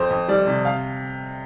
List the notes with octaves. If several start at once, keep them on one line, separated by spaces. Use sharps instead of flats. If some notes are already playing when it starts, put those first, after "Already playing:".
Already playing: F2 C5
F2
G3 D5
C3
F5